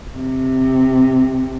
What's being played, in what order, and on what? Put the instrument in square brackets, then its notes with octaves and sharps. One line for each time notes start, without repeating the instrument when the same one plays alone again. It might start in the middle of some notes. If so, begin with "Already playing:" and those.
[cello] C3